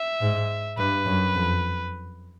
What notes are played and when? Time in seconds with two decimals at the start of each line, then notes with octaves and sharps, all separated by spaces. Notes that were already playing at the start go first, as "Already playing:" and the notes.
Already playing: E5
0.21 G#2
0.77 G2 B4
1.06 F#2
1.34 F2